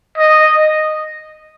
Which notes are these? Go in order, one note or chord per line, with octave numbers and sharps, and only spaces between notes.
D#5